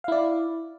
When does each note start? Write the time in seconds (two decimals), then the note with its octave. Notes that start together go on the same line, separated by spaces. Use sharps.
0.04 F5
0.08 E4
0.12 D5